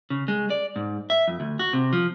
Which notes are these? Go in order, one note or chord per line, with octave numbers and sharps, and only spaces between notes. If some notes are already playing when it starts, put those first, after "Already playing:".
C#3
G#3
D5
G#2
E5
F2
D2
F#4
C3
F3